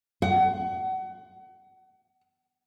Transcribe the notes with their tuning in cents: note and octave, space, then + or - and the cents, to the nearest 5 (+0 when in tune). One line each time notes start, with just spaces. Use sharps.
F#5 +30